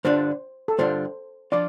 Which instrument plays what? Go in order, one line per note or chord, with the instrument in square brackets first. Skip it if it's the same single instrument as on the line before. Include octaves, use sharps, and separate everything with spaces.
[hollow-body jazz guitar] G2 D3 G3 D4 F4 [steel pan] C5
[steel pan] A4
[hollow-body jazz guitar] G2 D3 G3 D4 F4 [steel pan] C5
[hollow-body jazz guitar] F3 D4 F4 [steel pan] D5